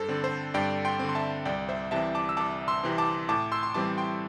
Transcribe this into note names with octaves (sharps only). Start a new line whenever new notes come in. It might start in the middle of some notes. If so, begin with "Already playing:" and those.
Already playing: G2 A4 C5
D3 C4
C5
G2 D5 G5
G5 C6
D3 C4
C6
E5 A5
C2 D5 G5
C5 E5
C3 E3 C4 E5 A5
A5 D6
E6
C2 A5 D6
C6 E6
C3 E3 C4
A5 D6
A2 A5 D6
C6 E6
C6
E3 G3 C4 A5 D6
G5 C6